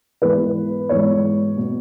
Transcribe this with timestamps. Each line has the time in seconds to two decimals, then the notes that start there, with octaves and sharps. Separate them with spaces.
0.22 G#2 E3 B3 B4
0.89 G#2 E3 B3 C#5
1.57 B2 B3